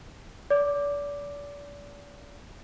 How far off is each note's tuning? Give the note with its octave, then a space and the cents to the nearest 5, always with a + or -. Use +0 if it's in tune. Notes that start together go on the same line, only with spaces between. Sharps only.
D5 -35 D6 +0